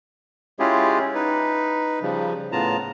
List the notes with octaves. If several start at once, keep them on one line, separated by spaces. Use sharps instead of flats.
G#3 C#4 E4 F4 G4 G#4
D#4 B4
C#3 F3 G3
A2 C#3 B3 F4 A5 A#5